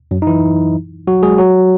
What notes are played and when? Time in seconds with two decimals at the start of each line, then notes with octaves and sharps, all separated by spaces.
0.11 F#2 F#3
0.22 D#4
0.27 E3 E4
1.07 F#3 F#4
1.23 G#3 G#4
1.38 F#3 F#4